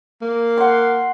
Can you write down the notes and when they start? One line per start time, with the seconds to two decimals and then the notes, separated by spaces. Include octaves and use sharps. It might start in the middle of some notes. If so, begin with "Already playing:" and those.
0.22 A#3
0.58 F#5 C6